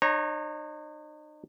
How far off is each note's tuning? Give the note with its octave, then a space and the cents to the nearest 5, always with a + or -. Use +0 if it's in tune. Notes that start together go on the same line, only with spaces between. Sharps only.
D#4 -40 C#5 -30 A#5 +5